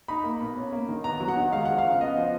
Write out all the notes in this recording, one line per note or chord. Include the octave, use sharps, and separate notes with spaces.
D#4 B5
A#3
B2
C#4
A#3
D#3
B3 A#5
F#3
F#5
D#3
G#3 F5
F3 F#5
F5
C#3
B3 D#5
F3